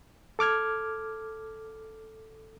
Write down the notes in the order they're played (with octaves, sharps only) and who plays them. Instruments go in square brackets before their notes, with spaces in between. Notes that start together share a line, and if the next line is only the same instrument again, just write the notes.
[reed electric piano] A4 D6 F6 G#6